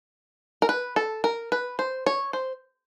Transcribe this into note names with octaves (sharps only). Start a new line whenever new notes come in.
A#4
B4
A4
A#4
B4
C5
C#5
C5